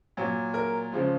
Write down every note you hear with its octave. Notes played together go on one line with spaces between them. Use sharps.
A#2 F#3
A#4
C#3 F3 G#3